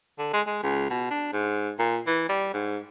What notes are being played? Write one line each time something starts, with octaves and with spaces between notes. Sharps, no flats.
D3
G#3
G#3
C#2
B2
D4
G#2
A#2
E3
G3
G#2